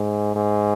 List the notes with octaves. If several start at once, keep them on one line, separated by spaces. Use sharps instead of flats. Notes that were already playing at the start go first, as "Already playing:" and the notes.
Already playing: G#2
G#2